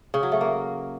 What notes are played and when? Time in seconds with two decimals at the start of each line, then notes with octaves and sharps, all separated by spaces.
0.14 C#3
0.23 F#3
0.32 A3
0.41 A#3